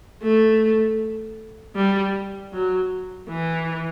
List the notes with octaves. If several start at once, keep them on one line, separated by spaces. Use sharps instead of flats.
A3
G3
F#3
E3